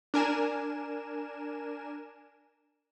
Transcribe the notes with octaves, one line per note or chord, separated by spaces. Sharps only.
D4 A#4 G#5 E7